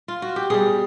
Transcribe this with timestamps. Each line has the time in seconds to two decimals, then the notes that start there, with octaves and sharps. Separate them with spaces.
0.08 F4
0.22 F#4
0.36 G4
0.50 B2 G3 G#4